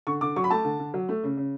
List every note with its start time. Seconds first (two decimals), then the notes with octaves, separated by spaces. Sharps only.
0.07 D3 C#6
0.21 D3 D6
0.36 F#3 C#6
0.44 B5
0.50 A3 A5
0.64 D3
0.80 D3
0.94 F#3
1.09 A3
1.23 C#3
1.37 C#3